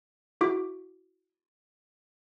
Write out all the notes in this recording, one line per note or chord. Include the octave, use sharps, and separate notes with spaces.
E4 F#4 D6